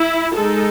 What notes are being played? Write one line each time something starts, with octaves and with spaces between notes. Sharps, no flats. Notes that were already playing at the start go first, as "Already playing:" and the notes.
Already playing: E4
G#3 D#4 A4